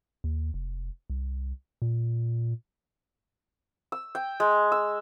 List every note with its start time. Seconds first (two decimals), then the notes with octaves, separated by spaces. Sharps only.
0.24 D#2
0.54 F1
1.10 C2
1.82 A#2
3.92 E6
4.15 G5
4.40 G#3
4.72 E6